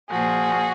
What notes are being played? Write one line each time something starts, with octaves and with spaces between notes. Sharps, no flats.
A#2 F3 F#4 G#4